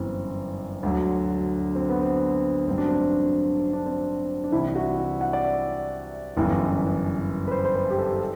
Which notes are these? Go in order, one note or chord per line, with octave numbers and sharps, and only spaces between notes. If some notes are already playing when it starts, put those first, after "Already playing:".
Already playing: G1 F#2 E3 C4
D2 D3 F#3
C4
B3
C4
A1 G2 F#3 C4
D4
C4
C4
D4
C4
D4
C2 C3 E3 E4
F#4
E5
F#5
D5
E5
G1 F#2 E3
B4
C5
C5
B4
G4
A4
G4